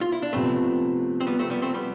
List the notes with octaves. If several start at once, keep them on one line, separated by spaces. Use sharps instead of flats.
F4
E4
D4
C3 F3 A3 B3 C4
C4
G3 B3
A3 C4
G3 B3
A3 C4
G3 B3